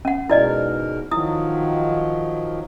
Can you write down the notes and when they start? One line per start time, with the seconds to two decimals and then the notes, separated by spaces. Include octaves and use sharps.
0.05 C#4 F#5
0.30 G#2 B2 E4 A#4 D5 D#5
1.11 D#3 F3 F#3 E4 D#6